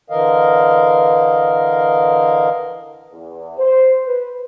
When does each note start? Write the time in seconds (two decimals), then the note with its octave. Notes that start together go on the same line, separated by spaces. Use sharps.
0.10 D3 E3 A#4 D#5 F5
3.12 E2
3.58 C5
4.05 B4